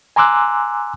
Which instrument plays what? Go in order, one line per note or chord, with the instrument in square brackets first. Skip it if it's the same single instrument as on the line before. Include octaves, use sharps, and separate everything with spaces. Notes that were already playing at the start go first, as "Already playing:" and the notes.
[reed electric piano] G#5 A#5 C6 D6 E6 F#6